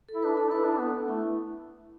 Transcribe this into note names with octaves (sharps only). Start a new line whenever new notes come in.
A4
E4
B4
D4
D4 A4
E4 B4
D4 B4
B3 A4
D4
A3 E4